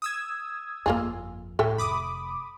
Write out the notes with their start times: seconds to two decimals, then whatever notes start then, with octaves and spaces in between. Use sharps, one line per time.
0.02 D#6 E6 G#6
0.86 G1 F2 A#3 F4 G#4
1.59 D1 A2 A4 E5 G5
1.78 F1 B5 D6 D#6